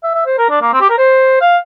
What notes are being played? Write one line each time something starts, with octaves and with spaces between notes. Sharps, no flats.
E5
E5
C5
A#4
D4
A#3
C4
G4
A#4
C5
F5